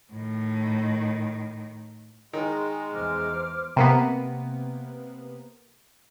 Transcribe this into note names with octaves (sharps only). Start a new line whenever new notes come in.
A2 D#3
D#3 G#3
E2 C5 D6 F6
C3 A#3 B3